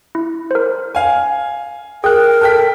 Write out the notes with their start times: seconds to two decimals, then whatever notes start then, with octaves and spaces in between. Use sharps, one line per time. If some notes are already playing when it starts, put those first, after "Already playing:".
0.15 E4
0.51 A#4 C5
0.95 F5 G#5
2.04 G#4 A#4 G5 F#6
2.41 A4 G5 B6